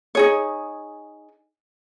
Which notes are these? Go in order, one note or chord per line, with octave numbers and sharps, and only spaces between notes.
D#4 G#4 C#5